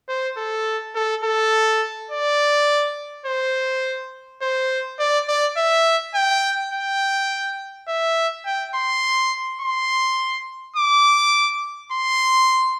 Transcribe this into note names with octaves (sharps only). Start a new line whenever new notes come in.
C5
A4
A4
A4
D5
C5
C5
D5
D5
E5
G5
G5
E5
G5
C6
C6
D6
C6